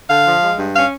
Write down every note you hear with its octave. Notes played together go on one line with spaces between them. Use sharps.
D3 F5
F3
G#3
G2
C#4 F5